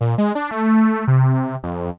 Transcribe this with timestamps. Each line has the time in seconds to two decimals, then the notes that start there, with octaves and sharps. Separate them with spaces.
0.01 A#2
0.18 G#3
0.35 D4
0.51 A3
1.08 C3
1.63 F2